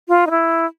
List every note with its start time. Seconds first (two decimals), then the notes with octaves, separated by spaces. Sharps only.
0.08 F4
0.27 D#4
0.31 E4